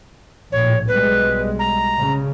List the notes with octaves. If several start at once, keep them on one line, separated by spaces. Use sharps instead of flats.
A#1 A2 C#5
B1 G3 G#3 B4
A#5
C#3